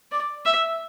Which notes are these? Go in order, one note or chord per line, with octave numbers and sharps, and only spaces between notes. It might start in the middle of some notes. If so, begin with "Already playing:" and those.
D5
E5